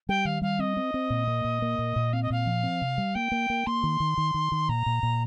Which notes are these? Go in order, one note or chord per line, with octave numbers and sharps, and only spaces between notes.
G3 G5
D#3 F5
G3 F5
C4 D#5
C4
C4
A#2
A#3
A#2
A#3
A#2
A#2
C4 F5
D#5
A#2 F5
F3
C4
C3
G3
A#3 G5
A#3
A#3
A#3 C6
D#3
D#3
D#3
D#3
D#3
A#2 A#5
A#2
A#2